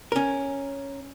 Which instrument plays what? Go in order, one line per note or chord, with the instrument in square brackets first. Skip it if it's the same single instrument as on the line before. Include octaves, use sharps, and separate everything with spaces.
[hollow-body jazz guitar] C#4 A#4